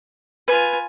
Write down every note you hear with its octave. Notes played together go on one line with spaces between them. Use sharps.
F4 B4 G#5